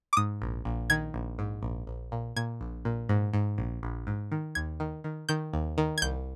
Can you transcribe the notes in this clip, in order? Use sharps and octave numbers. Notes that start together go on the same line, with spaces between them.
D6
G#2 D#6
A#1
A#1
D#3 G#6
A#1
G#2
A#1
A#1
A#2
A#2 G#6
A#1
A#2
G#2
G#2
A#1
A#1
G#2
D#3
D#2 G#6
D#3
D#3
D#3 G6
D#2
D#3
G#6
C2 G6